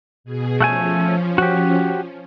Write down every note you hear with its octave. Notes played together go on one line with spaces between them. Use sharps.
B2 G#4
F3 A3 C#4 F#5 G#5
F#4 G4